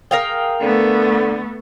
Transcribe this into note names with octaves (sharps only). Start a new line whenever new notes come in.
G#4 A#4 F5 G5
D3 A3 B3